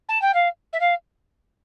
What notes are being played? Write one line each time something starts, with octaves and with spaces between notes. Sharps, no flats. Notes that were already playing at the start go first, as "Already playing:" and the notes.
A5
G5
F5
E5
F5